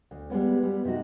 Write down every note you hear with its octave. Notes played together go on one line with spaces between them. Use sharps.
D2
G3 G#3 B3 C#4
G3 B3
C3 A3 D#4 F#4